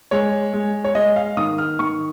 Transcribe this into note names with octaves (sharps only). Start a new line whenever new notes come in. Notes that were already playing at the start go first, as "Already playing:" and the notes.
G#3 C#5
G#3
C#5
G#3 D#5
F5
D#3 D#6
F6
D#3 C#6